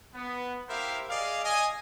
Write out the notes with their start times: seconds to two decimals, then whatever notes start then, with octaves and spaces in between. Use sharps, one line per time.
0.15 B3
0.69 E4 G4 A#4 C5 E5 F5
1.10 G#4 D5 D#5 F5
1.44 D#5 G#5